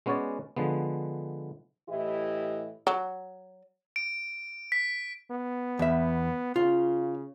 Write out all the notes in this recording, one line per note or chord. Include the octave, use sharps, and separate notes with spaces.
G#3 B3 C#4 F#4 C#5 D5
D3 F3 G#3 B3
A2 E3 E4 G4 D#5
F#3
D7
B6
B3
E2 E5
C#3 F4